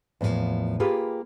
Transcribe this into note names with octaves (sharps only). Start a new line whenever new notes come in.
E2 A2 E3 F3 A#3
A#3 F4 G4 G#4 B4